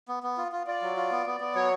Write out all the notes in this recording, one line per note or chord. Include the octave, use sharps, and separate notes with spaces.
B3
B3
F4
F4
F4 D5
F#3
F4
B3
B3
B3
F#3 C#5